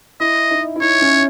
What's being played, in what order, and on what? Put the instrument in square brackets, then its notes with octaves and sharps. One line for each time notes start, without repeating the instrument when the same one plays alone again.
[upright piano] E4 [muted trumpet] D#5
[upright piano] D#4
E4
[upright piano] D#4 [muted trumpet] C#5
[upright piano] C#4